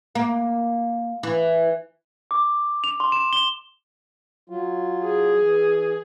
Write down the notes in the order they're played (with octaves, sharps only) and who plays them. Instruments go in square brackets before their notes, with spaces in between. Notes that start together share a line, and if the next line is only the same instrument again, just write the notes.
[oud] A#3
E3
[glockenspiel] D6
F7
C6
E7
G7
[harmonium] F#3 F4
[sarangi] G#4
[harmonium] E3